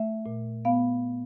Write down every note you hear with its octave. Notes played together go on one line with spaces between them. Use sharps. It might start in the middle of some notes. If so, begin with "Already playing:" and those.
Already playing: A3 E5
A#2
B3 F5